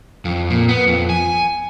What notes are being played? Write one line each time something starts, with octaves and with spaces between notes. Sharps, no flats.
F2
A#2
B3
F2
G#5